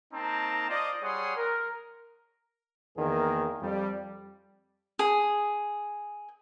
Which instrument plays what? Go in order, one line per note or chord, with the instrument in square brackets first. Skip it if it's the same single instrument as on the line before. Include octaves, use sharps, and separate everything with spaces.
[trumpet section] A#3 C4 D#4 A5 A#5
F4 C5 D5 D#5
G3 G#4 C#5 F#5 C6 D#6
A#4
[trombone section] E2 D#3 A#3 G#4 A#4
F2 G3
[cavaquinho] G#4